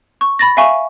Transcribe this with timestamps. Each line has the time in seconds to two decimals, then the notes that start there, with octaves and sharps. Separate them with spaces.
0.21 C#6
0.39 B5 A6 A#6
0.57 E5 F5 G#5 C#6